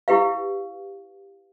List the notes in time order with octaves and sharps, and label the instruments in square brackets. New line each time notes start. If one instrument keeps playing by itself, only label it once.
[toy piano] E4 G4 B4 F5